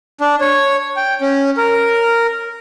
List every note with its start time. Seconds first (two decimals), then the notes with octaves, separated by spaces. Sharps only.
0.21 D4
0.41 C#5
0.96 G5
1.21 C#4
1.57 A#4